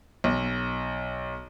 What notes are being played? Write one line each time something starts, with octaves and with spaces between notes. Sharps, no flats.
B1